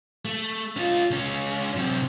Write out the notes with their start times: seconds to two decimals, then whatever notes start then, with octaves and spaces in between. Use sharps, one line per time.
0.25 A3
0.76 C#4 F4
1.11 C#2 C#4
1.75 F#2 C3